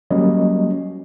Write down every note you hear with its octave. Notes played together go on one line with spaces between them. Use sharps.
F#3 G3 A#3 C#4 D#5